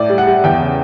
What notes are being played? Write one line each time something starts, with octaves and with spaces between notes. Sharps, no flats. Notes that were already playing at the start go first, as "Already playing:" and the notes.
Already playing: A2 D5
G3
F#5
G3
E2 G5
C#3